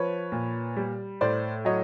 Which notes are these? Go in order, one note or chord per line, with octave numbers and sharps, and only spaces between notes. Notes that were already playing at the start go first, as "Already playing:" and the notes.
Already playing: F3 B4 C#5
A#2
G3
A2 C5 D5
F#3 C#5 D#5